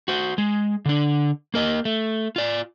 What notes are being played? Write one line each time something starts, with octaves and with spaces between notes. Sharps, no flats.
F#4 C5
G#3
D3 D4
A#3 A#4 D#5
A3
F4 D5